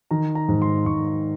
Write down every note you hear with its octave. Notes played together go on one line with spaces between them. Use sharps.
D#3 A#5
A#5
G#2
C6
G#2 C#6